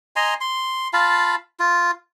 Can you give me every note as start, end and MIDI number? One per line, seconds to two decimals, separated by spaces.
0.16 0.34 75
0.16 0.34 80
0.16 0.34 82
0.16 0.34 84
0.41 0.88 84
0.93 1.35 65
0.93 1.35 77
0.93 1.35 81
0.93 1.35 83
1.60 1.91 65